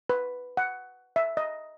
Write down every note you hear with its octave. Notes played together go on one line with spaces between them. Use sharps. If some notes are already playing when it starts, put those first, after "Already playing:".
B4
F#5
E5
D#5